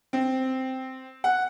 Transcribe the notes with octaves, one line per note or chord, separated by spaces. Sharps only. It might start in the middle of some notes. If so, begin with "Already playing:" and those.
C4
F#5